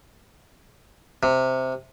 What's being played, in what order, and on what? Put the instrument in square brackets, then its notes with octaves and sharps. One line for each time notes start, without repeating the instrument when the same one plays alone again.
[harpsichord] C3